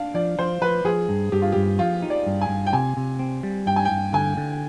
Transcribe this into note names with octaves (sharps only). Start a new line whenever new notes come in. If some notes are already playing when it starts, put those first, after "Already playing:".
Already playing: D4 F5
F3 D5
F3 C5
F3 B4
F3 G#4
G2
G2 G4
F4
G2 G4
F3 F4
D#4
D5
G2
G#5
G2
G5
C3 G#5
C3
C4
G3
G2 G5
G#5
G5
G2
D3 G#5
D3